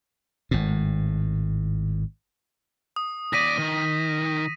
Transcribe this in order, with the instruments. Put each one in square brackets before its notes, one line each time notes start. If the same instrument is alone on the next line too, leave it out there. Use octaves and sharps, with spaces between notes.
[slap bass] G#1 A2
[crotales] D#6
[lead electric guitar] D#2 D5 [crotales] A#6 B6 D#7
[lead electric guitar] D#3